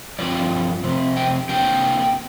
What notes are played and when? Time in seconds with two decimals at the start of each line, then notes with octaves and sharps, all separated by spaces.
0.19 G2 F3 C4 D5
0.83 F2 C3
1.17 G5
1.49 C3 A#3 D4 G5